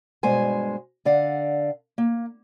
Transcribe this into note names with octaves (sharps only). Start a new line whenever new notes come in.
G2 B2 G#3 C5 G#5
D3 D5 F5 F#5
A#3